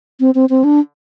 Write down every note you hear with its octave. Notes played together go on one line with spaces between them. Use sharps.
C4
C4
C4
D4